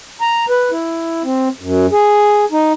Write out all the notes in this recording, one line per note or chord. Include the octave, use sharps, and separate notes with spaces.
A#5
B4
E4
C4
F#2
G#4
D#4